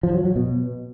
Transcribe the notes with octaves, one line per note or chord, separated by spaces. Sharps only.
F3
F#3
F#3
B2